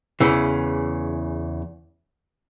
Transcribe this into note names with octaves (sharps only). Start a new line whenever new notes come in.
E2 C#3 E3